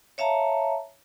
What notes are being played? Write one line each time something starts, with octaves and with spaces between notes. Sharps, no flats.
C#5 E5 F5 A5 A#5